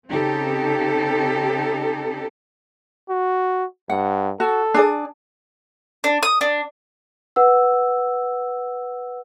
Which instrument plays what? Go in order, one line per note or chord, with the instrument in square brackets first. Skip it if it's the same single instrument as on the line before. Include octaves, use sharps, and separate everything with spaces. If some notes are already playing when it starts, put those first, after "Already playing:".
[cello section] C#3 C4 D#4 G4 A4
[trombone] F#4
[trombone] G2 [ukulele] F#5
[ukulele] F#4 [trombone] A4
[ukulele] D4 G#4 D5
[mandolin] D4
D#6
D4
[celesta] B4 F#5 E6